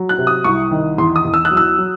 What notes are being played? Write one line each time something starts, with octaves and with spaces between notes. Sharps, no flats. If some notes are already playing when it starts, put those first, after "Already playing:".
Already playing: F#3
F#6
C3
D#6
C2 C#6
D#3
E2 C6
D#6
E2
E6
F#6
F#3
E6
F#3